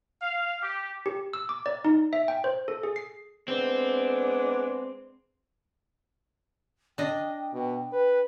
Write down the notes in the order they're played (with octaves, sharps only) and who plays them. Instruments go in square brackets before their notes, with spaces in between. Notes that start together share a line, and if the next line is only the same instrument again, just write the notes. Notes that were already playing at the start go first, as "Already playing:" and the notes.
[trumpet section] F5
G4
[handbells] G4
E6
D6
D5
D#4
E5
G5
C5
A4
G#4
C7
[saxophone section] G#3 B3 D4 [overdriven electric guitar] C4
[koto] D4 D#5 [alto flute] G5
[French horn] B2
B4